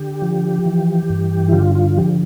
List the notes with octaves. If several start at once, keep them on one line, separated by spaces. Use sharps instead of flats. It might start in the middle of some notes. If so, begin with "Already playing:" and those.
Already playing: D3 G4
F3
E3
G2
E4
D3 F4
F4
F3 G4